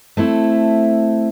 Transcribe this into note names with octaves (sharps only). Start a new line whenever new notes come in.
A3 C4 E4 A4